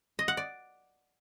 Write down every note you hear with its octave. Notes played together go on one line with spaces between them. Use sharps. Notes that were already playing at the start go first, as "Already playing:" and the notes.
D#5
F#5
D5